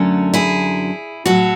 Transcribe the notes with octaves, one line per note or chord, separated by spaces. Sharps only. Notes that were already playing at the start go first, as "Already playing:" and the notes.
Already playing: F#2 D3 F#3 A3 C#4
E4 G#4
A2 F#3 F#4 A4